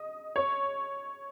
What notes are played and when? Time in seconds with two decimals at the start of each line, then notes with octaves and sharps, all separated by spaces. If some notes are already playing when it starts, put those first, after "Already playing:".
Already playing: D#5
0.36 C#5